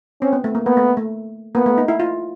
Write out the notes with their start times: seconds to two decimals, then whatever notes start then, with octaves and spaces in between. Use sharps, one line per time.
0.22 C4 C#4
0.33 B3
0.44 A3
0.55 A#3
0.66 A#3 B3
0.77 A3
0.97 A3
1.55 A#3 B3
1.66 A3
1.78 D#4
1.88 E4
2.00 F4